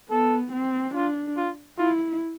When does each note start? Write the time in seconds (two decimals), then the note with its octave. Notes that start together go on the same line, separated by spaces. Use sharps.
0.10 B3 A4
0.53 C4
0.94 D4 F4
1.37 F4
1.78 E4 F4